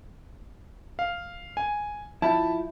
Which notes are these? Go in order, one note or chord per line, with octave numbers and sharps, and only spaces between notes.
F5
G#5
F3 E4 A5 B5